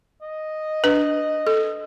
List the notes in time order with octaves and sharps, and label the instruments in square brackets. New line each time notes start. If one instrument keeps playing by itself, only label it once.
[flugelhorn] D#5
[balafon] D4 B4
A4